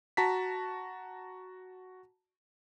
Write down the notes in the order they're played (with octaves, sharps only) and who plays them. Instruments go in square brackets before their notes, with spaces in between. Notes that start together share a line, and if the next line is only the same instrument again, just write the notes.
[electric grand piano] F#4 A5 A#5 B6